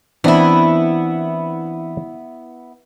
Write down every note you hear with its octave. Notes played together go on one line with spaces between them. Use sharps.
E3 B3 C4 D4 E4